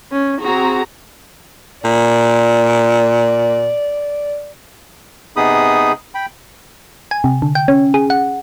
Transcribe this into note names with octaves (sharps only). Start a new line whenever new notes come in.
C#4
C4 F#4 G#4 A#5
A#2 D5
C3 B3 D#4 G#4 B5 D#6
G5 B5
G#5
C3
D3
G5
C#4
G#4
F#5